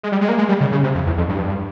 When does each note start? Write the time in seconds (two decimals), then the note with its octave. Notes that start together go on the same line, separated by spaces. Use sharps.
0.03 G#3
0.12 G3
0.21 G#3
0.29 A#3
0.38 G#3
0.49 G3
0.61 C#3
0.72 C#3
0.84 C3
0.95 F2
1.06 E2
1.18 F2
1.29 G2